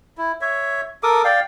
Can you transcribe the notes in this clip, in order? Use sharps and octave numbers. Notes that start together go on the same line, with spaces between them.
E4
C#5 E5
A4 A#4 D6 D#6
D5 F5 G5